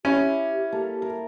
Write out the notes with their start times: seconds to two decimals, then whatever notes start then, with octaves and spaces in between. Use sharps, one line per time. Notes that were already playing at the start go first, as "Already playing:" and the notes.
0.05 C#4 E4 G4
0.72 A#3 A4
1.02 A#4